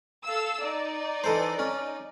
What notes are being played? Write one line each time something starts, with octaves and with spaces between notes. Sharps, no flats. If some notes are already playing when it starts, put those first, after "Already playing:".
A4 F5 E6
D#4 D5
E3 A4 C5
C#4